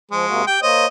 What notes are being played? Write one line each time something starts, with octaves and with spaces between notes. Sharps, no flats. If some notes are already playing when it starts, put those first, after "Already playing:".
F3 G#3
C3 A#3 F#4
G4 G5
A#3 C5 C#5 D#5